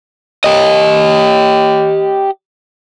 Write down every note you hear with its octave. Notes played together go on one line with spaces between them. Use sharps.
G4 D#5